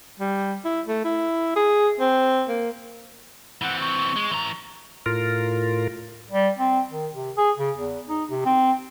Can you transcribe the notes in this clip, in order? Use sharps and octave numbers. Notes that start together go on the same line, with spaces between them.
G3
E4
A3
E4
G#4
C4
A#3
E3 C4 F#5
C#6
G#3
E3 A#5
A2 F4 A#4
G3
C4
D#3
C3
G#4
C#3
E2
D#4
C3
C4